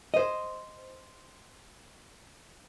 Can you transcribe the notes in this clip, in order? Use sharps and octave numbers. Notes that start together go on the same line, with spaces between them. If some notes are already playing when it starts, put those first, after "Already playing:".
C5 D#5